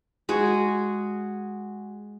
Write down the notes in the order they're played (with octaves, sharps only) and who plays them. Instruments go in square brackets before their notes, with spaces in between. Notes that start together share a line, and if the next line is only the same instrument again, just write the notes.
[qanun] G#3 F#4 G#4